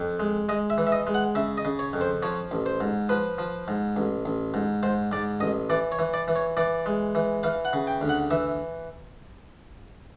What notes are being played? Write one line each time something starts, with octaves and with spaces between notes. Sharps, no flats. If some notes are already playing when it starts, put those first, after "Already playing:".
Already playing: F2
G#3
G#3 D#5
E5
E3
E5
D#5
G#3
F#5
C#3 E5
D#5
C#3
C#5
F2
C5
F3 C#5
A1
C5
G#2
F3 B4
F3
G#2
A1
A1
G#2
G#2 C5
G#2 D5
A1 D#5
E3 D5
C#5
E3
D5
E3
C#5
E3 D5
G#3
E3
E3 F5
F#5
C#3
G5
D2
F#5
E3 E5